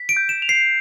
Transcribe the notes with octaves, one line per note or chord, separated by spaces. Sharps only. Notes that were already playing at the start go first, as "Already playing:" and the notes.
Already playing: B6
D7
G6
E7
F7
C7